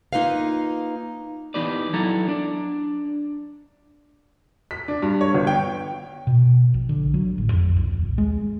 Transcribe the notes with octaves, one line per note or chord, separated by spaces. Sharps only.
A#3 D#4 F4 B4 F5
E3 B3 D#4 G4 B4 D5
F#3 E4 A4 A#5
D4 D5
B6
D4
G2
C#5
G1
G5
B2
A#1
D3
F#3
A1
F2
B1
D#1
G#3